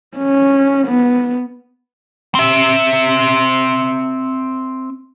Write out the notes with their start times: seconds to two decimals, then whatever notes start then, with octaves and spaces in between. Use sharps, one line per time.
0.17 C#4
0.86 B3
2.35 C4 E5